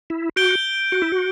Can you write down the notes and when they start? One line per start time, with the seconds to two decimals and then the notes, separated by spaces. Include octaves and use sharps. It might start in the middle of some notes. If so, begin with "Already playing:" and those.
0.10 E4
0.36 F#4 G6 D7 G7
0.92 F#4
1.02 E4
1.12 F#4